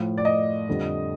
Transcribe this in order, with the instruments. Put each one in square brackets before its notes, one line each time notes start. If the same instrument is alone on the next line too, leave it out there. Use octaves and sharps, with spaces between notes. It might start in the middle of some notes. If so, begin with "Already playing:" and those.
Already playing: [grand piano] A2 F3
D5
D#5
F2 D3 G3